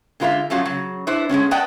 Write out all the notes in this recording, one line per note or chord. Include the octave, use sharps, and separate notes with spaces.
D3 G#3 F4 B4 E5 F5
F3 F#3 A3 C#4 F4 F#4
C#3 F#3
D4 E4 B4 C5 E5
G#3 A3 B3 C#4
B4 D5 D#5 F#5 G5 A5